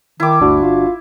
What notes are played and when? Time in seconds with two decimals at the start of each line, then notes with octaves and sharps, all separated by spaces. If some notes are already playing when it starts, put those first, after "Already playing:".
0.20 D#3 E4 D6
0.41 G1 D2 D4 F#4
0.62 F4